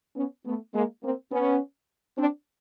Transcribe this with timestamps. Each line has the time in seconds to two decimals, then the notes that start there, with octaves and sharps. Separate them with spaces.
0.17 B3 C#4
0.46 A3 B3
0.74 G#3 A#3
1.03 A#3 C4
1.32 B3 C#4
2.17 C4 D4